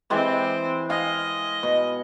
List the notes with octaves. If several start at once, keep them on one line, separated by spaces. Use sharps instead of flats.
E3 G#3 C4 G4
D#5 F5 G#5
B2